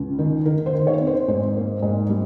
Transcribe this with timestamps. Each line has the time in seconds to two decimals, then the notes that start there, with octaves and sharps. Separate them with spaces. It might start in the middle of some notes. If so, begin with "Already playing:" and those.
Already playing: C#2
0.19 D#3
0.45 D#3 A#4
0.66 C5
0.73 D#3
0.87 C#5
1.01 C4
1.07 C5
1.28 G#2 C5
1.56 A#3
1.82 G#2
2.10 G3